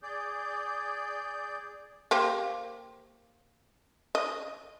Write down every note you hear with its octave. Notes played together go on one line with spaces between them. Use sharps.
G#4 D5 G6
A#3 G4 C5
D#5